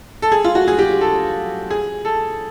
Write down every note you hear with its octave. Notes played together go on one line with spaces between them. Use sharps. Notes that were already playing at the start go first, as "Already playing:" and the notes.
A4
G#4
F4
F#4
G#4
G4
A4
G#4
A4